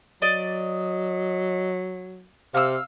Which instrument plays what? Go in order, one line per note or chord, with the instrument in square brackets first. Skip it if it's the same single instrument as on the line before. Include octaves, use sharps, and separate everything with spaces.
[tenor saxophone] F#3 [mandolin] D5 D#5
[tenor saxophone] C3 [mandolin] F5 E6